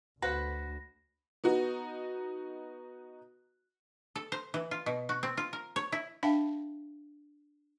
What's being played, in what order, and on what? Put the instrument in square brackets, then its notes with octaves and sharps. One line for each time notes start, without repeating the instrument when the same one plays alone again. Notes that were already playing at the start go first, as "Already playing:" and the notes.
[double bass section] D2 [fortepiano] F#4 C5 F#5 [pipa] B4 [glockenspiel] A#6
[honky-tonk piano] B3 D#4 F#4
[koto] A4
C5
E3
F4
B2
F#4
C4
F4
A#4
C#5
E4
[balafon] D4 E5 F5 G5 A5 B5